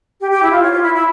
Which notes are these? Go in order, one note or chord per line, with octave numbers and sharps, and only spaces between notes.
G4
G4
E4
F4
C#5
F4
E4
E4